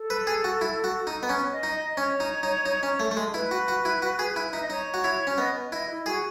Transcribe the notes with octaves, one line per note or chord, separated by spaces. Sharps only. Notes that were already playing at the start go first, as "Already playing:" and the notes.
Already playing: A4
B4
G#4
F#4
E4
F#4
D#4
B3
C#4 B4
D#5
D#4
D#5
C#4 C#5
D#4
D#4
D#4
C#4
A3
A3
G#3
E4 B4
F#4
F#4
E4
F#4
G#4
E4
D#4 E5
D#5
D#4 C#5
F#4
E4
C#4
B3 D#5
B4
E4 D#5
E4
F#4 G#4